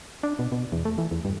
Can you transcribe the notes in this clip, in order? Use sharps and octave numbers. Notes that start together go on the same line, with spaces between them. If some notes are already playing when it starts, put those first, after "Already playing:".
D4
B2
B2
E2
A3
E3
E2
G2